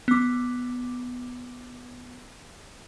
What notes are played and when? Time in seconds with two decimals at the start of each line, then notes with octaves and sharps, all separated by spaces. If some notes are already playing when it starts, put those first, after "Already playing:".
0.08 B3 D6